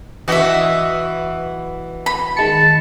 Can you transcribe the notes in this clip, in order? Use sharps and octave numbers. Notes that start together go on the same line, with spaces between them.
E3 F#4 D#5 E5
B5
D#3 G#3 A5 C#7